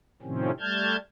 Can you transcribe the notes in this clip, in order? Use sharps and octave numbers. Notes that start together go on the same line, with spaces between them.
A2 C3 D#3 F3 C4 C#4
G3 A3 A5 F6 G6 G#6